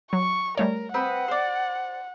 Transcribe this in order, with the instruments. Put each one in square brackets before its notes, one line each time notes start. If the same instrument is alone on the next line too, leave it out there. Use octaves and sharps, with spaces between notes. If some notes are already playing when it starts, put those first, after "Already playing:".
[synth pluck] F#3 [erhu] C#6
[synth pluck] G3 A3 C#5 [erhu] A#4
[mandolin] C4 B4 D#6 [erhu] F#5
[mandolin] C5 D5